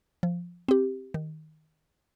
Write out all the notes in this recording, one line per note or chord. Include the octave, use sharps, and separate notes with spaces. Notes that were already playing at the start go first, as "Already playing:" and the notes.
F3
C4 G4
D#3